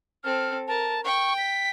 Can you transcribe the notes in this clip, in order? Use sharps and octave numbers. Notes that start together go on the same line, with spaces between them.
C4 A4 F6
A#4 A5
G5 C#6
B6